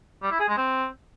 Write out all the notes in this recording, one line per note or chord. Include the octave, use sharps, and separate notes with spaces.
G3
E4
G#4
G#3
C4